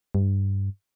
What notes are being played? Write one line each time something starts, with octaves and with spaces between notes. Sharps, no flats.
G2